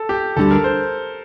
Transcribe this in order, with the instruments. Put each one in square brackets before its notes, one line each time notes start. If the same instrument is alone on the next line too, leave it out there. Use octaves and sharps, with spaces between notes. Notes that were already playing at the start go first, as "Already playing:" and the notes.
Already playing: [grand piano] A4
G4
[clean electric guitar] D2 D3 G3 [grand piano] A4
[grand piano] A#4
C5